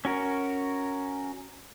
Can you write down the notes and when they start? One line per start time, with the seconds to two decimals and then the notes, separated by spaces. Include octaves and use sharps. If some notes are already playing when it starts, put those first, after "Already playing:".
0.05 C#4 F#4 A#4